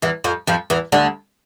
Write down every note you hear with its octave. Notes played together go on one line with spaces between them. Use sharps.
E2 E3
F2 F3
F2 F3
E2 E3
D2 D3